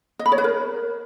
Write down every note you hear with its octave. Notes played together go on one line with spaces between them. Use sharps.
D#5
B5
C#5
B4
A#4